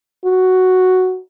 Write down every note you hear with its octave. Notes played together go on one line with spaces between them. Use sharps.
F#4